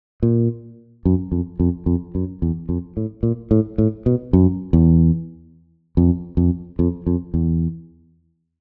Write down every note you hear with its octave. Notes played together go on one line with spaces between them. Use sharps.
A#2
F#2
F2
F2
F2
F#2
E2
F2
A2
A#2
A2
A2
B2
F#2
E2
F2
F2
F2
F2
E2